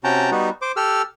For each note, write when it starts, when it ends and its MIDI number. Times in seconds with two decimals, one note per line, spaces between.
0.04 0.30 48
0.04 0.30 61
0.04 0.30 66
0.04 0.30 79
0.04 0.30 81
0.04 0.30 82
0.32 0.50 55
0.32 0.50 59
0.32 0.50 63
0.32 0.50 66
0.62 0.72 72
0.62 0.72 86
0.76 1.02 67
0.76 1.02 69
0.76 1.02 88
0.76 1.02 89